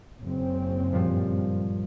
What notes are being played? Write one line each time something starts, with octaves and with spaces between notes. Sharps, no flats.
F#1 C#3 C4
G2 A#2 F3